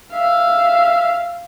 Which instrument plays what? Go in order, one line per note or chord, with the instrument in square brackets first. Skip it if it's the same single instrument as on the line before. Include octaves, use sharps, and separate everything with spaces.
[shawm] E5 [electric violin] F5